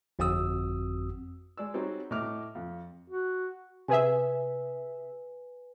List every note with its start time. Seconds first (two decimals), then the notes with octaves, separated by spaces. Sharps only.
0.19 G1 F2 C4 F#4 D#6 E6
1.57 G#3 D5 E6
1.74 G3 C4 D#4 F#4 G#4 C#5
2.11 A2 D#5 D6 F6
2.55 F2
3.10 F#4
3.88 C3 G#4 B4 E5 G#5